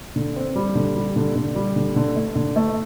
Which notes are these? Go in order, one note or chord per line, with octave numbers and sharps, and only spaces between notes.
D3
C4
G3
D3
G3
D3
D3
G3
D3
D3
A3
D3
A3